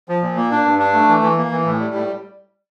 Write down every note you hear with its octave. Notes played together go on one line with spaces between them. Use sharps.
F3
A#2
A#3
D4
G2
D4
A3
E3
E3
A#3
E3
A2
G3
A2